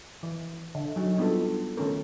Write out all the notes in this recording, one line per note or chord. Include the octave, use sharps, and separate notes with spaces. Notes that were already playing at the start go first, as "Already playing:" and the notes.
E3
D3
F#3 D#4
G3 B3 D4 F4 A4
D#3 A3 C#4 A4 A#4